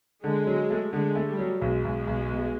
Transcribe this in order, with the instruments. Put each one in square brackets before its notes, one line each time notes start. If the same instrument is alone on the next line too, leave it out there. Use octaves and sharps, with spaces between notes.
[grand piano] D3 [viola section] G#3
[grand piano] F#3
A3
[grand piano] D3 [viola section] G#3
[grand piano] A3
[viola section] G3
[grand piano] F#3
[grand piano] B1 [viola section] G#3
[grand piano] B1
B1
B2